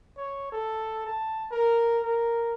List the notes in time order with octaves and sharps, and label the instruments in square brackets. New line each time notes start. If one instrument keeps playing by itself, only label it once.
[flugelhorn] C#5
A4
A5
A#4
A#4